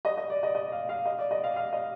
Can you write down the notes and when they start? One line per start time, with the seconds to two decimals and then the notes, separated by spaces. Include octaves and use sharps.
0.05 D#5
0.17 D#5
0.30 D5
0.43 D#5
0.55 D#5
0.72 F5
0.89 F5
1.06 D#5
1.19 D5
1.31 D#5
1.44 F5
1.56 F5
1.73 D#5